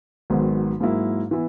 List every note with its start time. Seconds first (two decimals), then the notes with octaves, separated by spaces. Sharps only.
0.30 G#1 G#2 D#3 F#3 B3
0.81 G#2 F#3 A#3 E4
1.31 E3 B3 E4